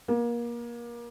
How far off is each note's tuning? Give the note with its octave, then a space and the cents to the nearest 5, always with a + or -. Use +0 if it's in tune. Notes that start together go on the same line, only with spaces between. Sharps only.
A#3 +25